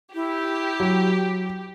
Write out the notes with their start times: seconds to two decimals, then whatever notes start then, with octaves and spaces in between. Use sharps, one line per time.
0.15 E4 G4
0.80 F#3